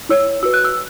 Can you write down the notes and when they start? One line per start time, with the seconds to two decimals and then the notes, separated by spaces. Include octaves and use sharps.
0.09 E4 C#5 E6
0.43 F#4 E6
0.45 B4
0.54 F#6
0.65 E6